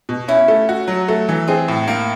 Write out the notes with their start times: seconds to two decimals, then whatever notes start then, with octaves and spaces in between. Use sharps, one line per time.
0.09 B2
0.28 C#4 E4
0.48 A3
0.69 F#4
0.88 F#3
1.08 A3
1.29 E3
1.48 C4 G#4
1.68 A2
1.88 A#3